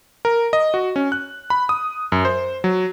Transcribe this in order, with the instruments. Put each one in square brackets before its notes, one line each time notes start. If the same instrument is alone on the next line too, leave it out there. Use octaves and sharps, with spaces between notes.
[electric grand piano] A#4
D#5
F#4
C#4
F#6
B5
D#6
F#2
C5
F#3